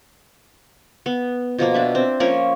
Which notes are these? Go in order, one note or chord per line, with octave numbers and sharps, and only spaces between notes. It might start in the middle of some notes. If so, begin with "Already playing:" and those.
B3
B2 F3 A#3
D4 B4 E5
C4
F3 A#3 C#4 A#4